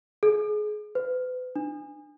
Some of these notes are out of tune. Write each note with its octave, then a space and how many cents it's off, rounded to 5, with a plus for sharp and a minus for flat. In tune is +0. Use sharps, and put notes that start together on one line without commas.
G#4 +25
B4 +40
D4 +20